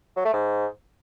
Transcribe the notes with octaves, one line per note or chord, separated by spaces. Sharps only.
F#3
A3
G#2